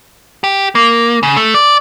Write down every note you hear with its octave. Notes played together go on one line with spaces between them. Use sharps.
G4
A#3
C#3
A3
D5